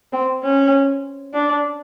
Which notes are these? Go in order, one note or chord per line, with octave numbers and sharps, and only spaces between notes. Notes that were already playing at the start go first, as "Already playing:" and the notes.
C4
C#4
D4